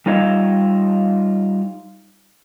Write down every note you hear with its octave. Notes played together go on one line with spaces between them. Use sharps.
G3 D#4 F4 C#5 D#5 E5